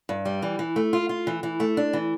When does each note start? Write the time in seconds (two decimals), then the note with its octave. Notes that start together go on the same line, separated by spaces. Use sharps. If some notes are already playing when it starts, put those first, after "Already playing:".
0.09 G2
0.25 G3
0.42 E3
0.59 E3
0.76 A3
0.93 F4
1.09 F4
1.27 E3
1.43 E3
1.60 A3
1.77 D4
1.93 E3